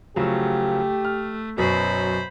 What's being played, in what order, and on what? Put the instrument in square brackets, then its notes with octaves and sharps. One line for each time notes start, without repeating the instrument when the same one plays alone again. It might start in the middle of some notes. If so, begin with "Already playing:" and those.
[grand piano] C#3 F3 F#3 [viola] A3 [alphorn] G4
[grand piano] F6
[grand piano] F#2 B2 [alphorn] F#3 [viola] C5 B5